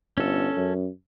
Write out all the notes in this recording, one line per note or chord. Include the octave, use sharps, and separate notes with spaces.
G1 C#4 A4
F#2